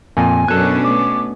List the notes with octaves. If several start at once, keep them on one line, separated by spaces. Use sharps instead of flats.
F2 A#2 G#5
F#2 B2 C#4 D4 A4 G#5 F#6
A3 B3 D6